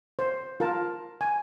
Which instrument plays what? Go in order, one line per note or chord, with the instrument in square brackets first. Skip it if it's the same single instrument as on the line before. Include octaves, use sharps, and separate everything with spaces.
[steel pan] C5
F4 A#4 A5
G#5